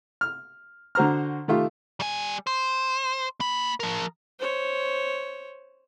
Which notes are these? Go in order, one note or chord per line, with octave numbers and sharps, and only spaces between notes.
F6
D3 F#4 C5 A#5 F6
D#3 A3 F4 G4
G3 G#5
C5
A#3 B5
F3 A#4
C5 C#5